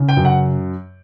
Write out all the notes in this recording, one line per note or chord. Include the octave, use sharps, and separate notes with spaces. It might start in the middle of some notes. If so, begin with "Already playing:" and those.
Already playing: C#3
G5
F#2
F#5